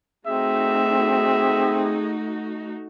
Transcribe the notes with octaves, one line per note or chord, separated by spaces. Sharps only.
A3 C4 D#4 F#4 G#4 E5